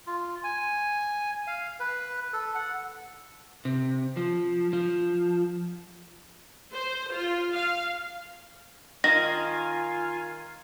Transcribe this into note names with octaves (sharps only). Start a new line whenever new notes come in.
F4
G#5
F5
B4
A4
F#5
C3
F3
F3
C5
F4
F5
D#3 F4 F5 G#5 A#6